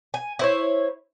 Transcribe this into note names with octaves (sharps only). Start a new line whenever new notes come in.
G#5
E4 C5 C#5